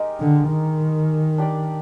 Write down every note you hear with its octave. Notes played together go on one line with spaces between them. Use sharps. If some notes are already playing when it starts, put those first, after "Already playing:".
Already playing: G#3 D#4 G4 A#4
D3
D#3
D4 G4 D5